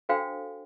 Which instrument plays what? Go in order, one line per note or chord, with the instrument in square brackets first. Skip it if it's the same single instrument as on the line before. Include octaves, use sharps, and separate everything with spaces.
[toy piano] D4 F#4 A4 C5 F5 G5